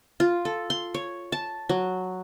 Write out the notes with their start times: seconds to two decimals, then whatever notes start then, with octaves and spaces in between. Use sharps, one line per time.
0.20 F4
0.45 A4
0.70 C6
0.94 C#5
1.32 A5
1.69 F#3